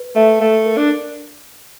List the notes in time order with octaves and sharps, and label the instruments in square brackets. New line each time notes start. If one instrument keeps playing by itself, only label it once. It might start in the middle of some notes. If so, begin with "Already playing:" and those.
Already playing: [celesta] B4
[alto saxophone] A3 [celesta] E5
[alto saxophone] A3 [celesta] F5
[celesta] A#4
[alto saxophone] D4